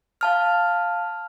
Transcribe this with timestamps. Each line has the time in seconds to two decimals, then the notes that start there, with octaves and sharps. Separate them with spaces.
0.21 F5 A5 F6